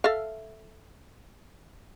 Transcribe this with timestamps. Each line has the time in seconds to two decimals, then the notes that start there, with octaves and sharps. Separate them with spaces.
0.04 A4 E5 F5